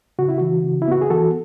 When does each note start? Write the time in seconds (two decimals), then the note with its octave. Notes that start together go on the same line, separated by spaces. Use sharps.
0.19 C#3 F#4
0.29 E4
0.38 E3 F#4
0.64 C#3
0.82 E4
0.88 B3 F#4
1.01 G#4
1.10 E3 F#4 A4